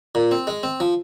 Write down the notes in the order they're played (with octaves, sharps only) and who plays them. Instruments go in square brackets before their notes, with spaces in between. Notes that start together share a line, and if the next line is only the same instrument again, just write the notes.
[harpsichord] A#2
C4
G#3
C4
F3